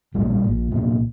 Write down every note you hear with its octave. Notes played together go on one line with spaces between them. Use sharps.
A#1 A#2 G3 A3
G3
A#1 A#2
C2 A#2 A3
C4